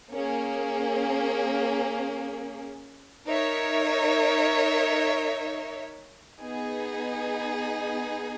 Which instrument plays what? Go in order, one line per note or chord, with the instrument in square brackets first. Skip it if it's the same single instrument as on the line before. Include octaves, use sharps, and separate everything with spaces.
[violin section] A#3 C#4 G#4
D#4 A#4 C#5 E5
B3 D#4 G#4